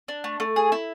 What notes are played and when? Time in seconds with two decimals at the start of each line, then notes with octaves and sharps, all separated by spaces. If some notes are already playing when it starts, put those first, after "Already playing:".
0.08 D4
0.24 A3
0.40 A3
0.56 G#4
0.72 E4